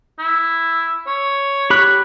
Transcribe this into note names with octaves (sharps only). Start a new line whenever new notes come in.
E4
C#5
G4 B5 F#6